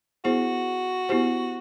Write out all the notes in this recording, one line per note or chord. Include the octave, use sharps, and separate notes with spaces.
B3 E4 F#4 G#4 C5
B3 E4 G4 C5